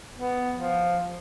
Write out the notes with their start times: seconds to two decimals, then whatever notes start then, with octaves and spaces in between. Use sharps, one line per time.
0.18 B3
0.57 F3